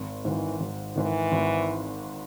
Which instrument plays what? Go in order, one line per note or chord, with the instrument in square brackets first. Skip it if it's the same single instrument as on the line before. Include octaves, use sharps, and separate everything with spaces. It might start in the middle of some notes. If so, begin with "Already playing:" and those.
Already playing: [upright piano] G#1
[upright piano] G#2 D#3 [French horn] E3
[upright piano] G#1
[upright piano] G#2 D#3 [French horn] E3
[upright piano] G#1